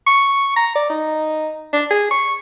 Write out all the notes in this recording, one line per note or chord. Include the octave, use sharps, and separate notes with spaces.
C#6
A#5
D5
D#4
D4
G#4
C#6